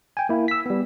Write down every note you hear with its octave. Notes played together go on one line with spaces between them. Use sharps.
G5 G#5
A#3 E4
E6 B6
G3 B3